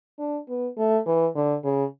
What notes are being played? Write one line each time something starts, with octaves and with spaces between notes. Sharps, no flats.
D4
B3
A3
E3
D3
C#3